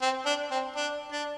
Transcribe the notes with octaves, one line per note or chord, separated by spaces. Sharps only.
C4
D4
C4
D4
D4